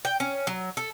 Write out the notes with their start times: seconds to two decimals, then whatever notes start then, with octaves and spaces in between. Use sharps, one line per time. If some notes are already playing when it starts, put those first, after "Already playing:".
0.05 G5
0.20 C#4
0.47 F#3
0.77 A4